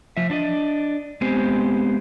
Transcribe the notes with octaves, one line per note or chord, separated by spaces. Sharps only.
F3 E5
D4 D5 D#5
G#3 B3 C4 G4 C5 G#5